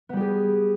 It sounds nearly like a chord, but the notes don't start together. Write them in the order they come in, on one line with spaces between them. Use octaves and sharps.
B3 G3 G4 G#4